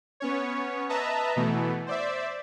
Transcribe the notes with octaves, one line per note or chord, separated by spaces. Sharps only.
B3 C#4 C#5
B4 D#5 E5 A5 A#5
B2 E3 A3 B3
C5 D5 E5